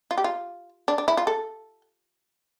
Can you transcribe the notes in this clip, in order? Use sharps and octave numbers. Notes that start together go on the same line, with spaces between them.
F4
G4
F4
D4
D4
E4
F4
A4